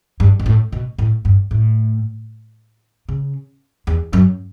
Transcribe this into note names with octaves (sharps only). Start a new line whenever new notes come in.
G2
B2
A2
B2
A2
G2
A2
C#3
E2
F#2